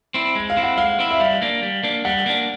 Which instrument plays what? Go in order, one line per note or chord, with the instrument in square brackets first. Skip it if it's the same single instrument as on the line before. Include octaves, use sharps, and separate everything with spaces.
[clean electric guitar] C4 E4
G#3
[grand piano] F5
[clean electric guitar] C4 E4
[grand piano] F#5
[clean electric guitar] G#3 [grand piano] F5
[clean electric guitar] C4 E4
[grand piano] E5
[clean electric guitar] G3 [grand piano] F5
[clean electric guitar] A#3 D4
G3
A#3 D4
[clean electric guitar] G3 [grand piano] F#5
[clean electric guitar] A#3 D4